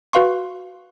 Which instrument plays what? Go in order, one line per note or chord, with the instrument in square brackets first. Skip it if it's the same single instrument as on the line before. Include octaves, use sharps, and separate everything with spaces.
[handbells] F#4 B4 F5 C6 C#6